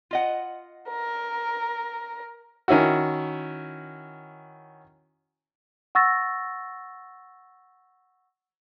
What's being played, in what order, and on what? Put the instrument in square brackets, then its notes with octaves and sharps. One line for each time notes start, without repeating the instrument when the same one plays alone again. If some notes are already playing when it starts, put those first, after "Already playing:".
[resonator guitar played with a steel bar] F4 D#5 F#5
[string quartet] A#4
[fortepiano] D#3 C#4 E4 F#4
[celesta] F#5 C#6 E6 A6 A#6